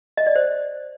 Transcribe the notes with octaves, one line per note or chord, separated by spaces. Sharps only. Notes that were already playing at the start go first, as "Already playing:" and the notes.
D#5
D5
C5